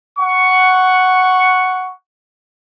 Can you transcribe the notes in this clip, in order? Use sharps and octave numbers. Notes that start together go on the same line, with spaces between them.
F#5 C#6